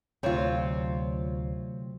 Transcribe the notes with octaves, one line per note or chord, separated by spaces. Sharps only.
D2 C3 F#3 A3 C4 F4 C#5